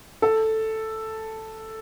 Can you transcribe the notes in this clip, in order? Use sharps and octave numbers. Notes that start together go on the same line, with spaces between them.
A4